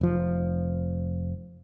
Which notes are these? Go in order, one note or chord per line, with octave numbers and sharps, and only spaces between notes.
F1 F3